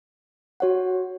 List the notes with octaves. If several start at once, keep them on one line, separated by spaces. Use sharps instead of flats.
F#4 C#5 F#5